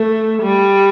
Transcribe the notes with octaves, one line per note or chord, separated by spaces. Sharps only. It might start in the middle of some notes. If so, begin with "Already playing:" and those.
Already playing: A3
G3